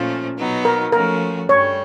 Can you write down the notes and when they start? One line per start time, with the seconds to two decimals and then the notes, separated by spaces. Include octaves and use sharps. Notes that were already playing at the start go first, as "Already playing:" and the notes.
Already playing: A#2 F3 A3 C#4
0.37 B2 F#3 B3 D#4
0.65 A#4
0.92 F3 A3 C#4 F#4 A#4
1.49 G2 D3 G3 C#5